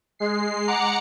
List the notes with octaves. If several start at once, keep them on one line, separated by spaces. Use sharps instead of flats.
G#3 C7
F#5 A#5 D6 C#7